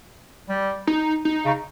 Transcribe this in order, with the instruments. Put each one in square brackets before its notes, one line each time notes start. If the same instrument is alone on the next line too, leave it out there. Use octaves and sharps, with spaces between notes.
[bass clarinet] G3
[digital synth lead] D#4
D#4
[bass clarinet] C#3